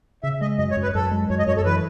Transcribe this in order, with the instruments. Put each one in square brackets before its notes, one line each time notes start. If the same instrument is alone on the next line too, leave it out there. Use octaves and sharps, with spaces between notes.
[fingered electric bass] C#3 [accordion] E5
[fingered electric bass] G#3 [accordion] D#5
[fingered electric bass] F#2 [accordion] D#5
[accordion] C#5
[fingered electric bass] F#2
[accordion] B4
[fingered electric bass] F#2 [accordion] A4
[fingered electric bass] G#3
[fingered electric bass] F#2 [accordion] C#5
[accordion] D#5
[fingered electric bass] F#2 [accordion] C#5
[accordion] A4
[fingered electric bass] E3 [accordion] B4